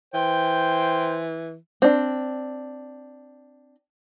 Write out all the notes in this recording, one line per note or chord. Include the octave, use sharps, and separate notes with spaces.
E3 C5 G5
C4 D4